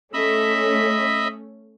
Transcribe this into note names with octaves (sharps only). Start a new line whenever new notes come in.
A3 C#4 D#5 E5 B5